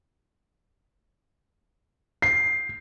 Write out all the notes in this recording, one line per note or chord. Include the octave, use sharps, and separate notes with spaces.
C7